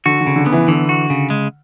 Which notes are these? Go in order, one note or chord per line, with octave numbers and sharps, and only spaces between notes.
D3 F#4
D3
C#3
D3
B3
E3
D3 E3
F#4
C#3
G#3